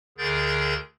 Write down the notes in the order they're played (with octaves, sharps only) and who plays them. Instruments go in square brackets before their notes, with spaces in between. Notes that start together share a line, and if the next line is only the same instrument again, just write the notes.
[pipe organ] D2 D3 G#4 A#4 G6 A6